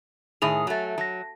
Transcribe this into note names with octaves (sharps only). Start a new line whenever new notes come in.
A2 D#3 G#4 G#5 F7
F#3 A3
F#3 A5 A#6